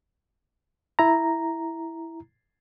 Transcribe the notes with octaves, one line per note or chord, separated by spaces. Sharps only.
E4 A#5